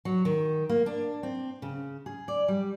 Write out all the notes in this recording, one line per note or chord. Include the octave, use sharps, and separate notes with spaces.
F#3
D#3
A#3
D4
C4
C#3
G#4
D5
G3